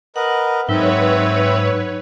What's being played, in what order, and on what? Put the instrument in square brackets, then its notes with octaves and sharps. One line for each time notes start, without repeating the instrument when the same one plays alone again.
[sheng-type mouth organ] A#4 B4 D#5 [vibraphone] F#5
[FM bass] G#2 [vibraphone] F#3 D#4 [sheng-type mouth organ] C4 E5 [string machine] B4 C#5